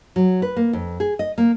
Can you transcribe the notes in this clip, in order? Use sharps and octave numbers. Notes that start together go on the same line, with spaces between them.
F#3
B4
A#3
F2
G#4
D#5
A#3